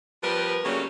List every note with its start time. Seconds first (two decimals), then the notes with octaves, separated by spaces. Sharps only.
0.23 F3 G3 B3 A#4 B4
0.65 C#3 F#3 G3 A3 A#3 C#4